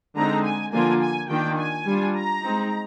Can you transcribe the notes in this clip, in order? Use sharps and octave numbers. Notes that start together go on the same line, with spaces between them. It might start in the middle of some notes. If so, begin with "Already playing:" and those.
D3 G#3 C4 D#4 A#5
G#5
D3 F3 A#3 F4 G#5
G#5
D#3 A#3 D4 F4 G5
G#5
G3 D4 F4
A#5
G#3 C4 D#4